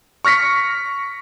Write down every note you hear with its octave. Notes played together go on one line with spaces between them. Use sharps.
C#6 F6 A#6 B6 C#7